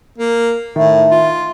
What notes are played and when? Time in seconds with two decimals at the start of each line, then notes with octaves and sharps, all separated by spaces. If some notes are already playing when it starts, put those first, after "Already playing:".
0.18 A#3
0.76 A2 D#3 E5
1.11 F4